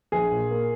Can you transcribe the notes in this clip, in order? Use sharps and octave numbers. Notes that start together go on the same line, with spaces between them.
A#1 G#4
A#2
A#3